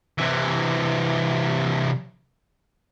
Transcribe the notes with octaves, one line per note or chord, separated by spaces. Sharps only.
C3 E3